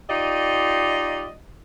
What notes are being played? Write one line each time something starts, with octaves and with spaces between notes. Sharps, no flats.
D#4 F4 G4 D5 D#5